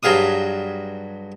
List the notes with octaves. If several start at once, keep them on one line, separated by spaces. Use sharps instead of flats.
G2 F#3 G#4 F5 D#6